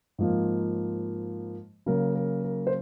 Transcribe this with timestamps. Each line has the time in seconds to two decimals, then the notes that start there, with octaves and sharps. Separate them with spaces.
0.18 G#2 F3 A#3
1.86 C#3 F#3 A#3 A#4
2.15 A#4
2.44 A#4
2.67 C5